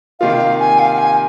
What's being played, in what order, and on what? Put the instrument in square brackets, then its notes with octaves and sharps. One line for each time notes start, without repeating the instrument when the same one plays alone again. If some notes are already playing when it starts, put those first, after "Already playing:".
[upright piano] C3 D#3 A#3 F4 [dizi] F5
[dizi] G#5
F5
G#5